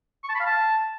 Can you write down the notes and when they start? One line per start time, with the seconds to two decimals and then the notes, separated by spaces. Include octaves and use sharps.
0.24 C#6
0.29 A5
0.35 B5
0.40 F5
0.46 A5